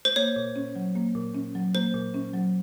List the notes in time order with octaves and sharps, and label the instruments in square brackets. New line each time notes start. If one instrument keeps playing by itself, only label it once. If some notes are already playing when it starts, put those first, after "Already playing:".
[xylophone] C5
[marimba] A#3 [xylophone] C#5
[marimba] A#2
C#4
F#3
A#3
A#2
C#4
F#3
[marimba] A#3 [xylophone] C5
[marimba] A#2
C#4
F#3